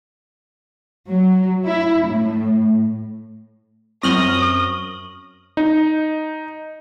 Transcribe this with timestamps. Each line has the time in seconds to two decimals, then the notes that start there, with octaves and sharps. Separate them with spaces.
1.08 F#3
1.66 E4
2.07 A2
4.03 F#2 C4 C#6 D#6 F6 A#6 F#7 G7
5.57 D#4